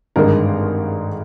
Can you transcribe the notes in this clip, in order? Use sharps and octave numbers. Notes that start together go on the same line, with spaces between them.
G#1 G2 D3 G#3 A#4